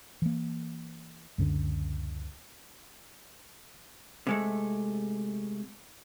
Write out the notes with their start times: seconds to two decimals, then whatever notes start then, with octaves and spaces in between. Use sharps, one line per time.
0.22 E3 A#3
1.38 C#2 F#2 D3 D4
4.27 C3 G#3 A3